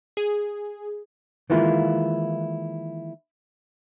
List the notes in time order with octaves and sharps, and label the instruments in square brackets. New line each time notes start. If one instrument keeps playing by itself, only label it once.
[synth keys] G#4
[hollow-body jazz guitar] D#3 E3 G#3 A#3 E4 F4